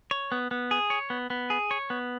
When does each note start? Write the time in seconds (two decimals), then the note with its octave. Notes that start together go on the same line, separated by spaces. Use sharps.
0.11 C#5
0.32 B3
0.51 B3
0.71 G#4
0.90 C#5
1.10 B3
1.30 B3
1.50 G#4
1.71 C#5
1.90 B3